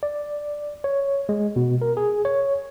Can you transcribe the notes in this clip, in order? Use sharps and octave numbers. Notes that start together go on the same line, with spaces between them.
D5
C#5
G#3
B2
A#4
G#4
C#5